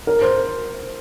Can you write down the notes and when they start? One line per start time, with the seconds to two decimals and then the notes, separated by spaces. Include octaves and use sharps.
0.07 A#4
0.22 C5